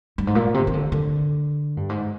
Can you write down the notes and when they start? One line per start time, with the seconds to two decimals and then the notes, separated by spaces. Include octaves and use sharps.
0.18 G2
0.27 G#2
0.35 A#2
0.54 C3
0.67 D#3
0.73 D3
0.92 D3
1.77 G2
1.89 G#2